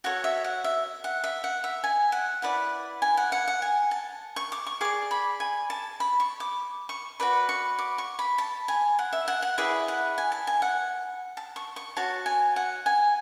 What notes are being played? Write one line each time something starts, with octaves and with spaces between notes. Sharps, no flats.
F#4 A4 C#5 F#5
E5
F#5
E5
F#5
E5
F#5
E5
G#5
F#5
E4 B4 D5 F#5
G#5
F#5
F#5
F#5
G#5
A5
C#6
D6
C#6
G#4 D5 D6
B5
G#5
A5
B5
C#6
D6
C#6
F#4 B4 D5 B5
C#6
D6
C#6
B5
A5
G#5
F#5
E5
F#5
F#5
E4 G#4 B4 D5 E5
F#5
G#5
A5
G#5
F#5
A5
C#6
C#6
F#4 C#5 A5
G#5
F#5
G#5